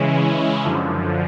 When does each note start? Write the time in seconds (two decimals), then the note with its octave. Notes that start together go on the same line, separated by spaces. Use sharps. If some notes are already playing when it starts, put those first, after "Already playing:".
Already playing: C#3 E3 G#3 C#4 E4
0.64 F#2 D3 F3